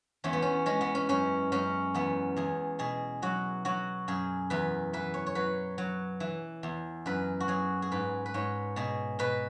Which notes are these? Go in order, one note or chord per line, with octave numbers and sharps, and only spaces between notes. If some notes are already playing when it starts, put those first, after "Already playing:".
E2 C#4
B3
C#4
G#3 C#4
B3
C#4
F#2 C#4
F#2 C#4
E2 B3
E2 G#4
B2 G#4
F#3 F#4
F#3 F#4
F#2 G#4
E2 B4
E3 B4
C#5
C#5
F#3 B4
F#3
E3
E2
F#2 B4
F#4
F#3 G#4
G#4
G#2 B4
B4
G#2 C#5
B2 G#4
B2 B4